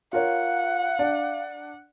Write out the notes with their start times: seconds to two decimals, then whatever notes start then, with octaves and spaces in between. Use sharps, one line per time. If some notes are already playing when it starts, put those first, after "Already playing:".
0.13 F4 A#4 C#5 F5 F#5
0.99 D4 D5